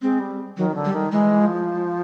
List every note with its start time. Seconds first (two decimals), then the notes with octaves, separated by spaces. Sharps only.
0.02 G#3 C4
0.20 G3
0.57 D#3 F#3
0.75 D3
0.85 G3
0.93 D#3
1.12 E3 G#3
1.40 F3